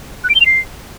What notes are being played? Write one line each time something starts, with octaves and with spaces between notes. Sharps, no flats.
F#6
D7
G7
F7
C7